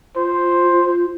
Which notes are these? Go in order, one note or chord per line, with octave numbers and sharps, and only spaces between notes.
F4 C5